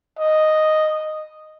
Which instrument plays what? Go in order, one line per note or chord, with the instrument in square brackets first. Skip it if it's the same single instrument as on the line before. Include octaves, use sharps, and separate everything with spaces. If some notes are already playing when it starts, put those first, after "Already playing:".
[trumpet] D#5